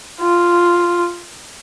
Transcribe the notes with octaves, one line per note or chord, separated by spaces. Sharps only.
F4